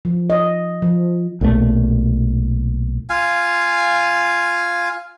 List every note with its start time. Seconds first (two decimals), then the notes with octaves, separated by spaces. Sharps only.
0.05 F3
0.30 D#5
0.82 F3
1.41 B1 A#2 D3 A3
3.09 F4 F5 G#5